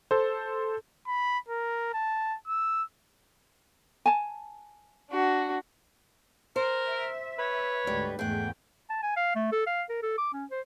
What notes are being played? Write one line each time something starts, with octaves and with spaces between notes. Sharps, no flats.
A4 C5
B5
A#4
A5
E6
G#5 A5
D4 F#4
A#4 C5
E5
B4 C#5
D2 G#2 D3 G3
E2 G#2 A3 G#4 F#5 G5
A5
G#5
F5
A3
A4
F5
A#4
A4
D6
C#4
C5